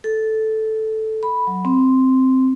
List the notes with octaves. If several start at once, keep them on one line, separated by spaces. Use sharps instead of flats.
A4
B5
F#3
C4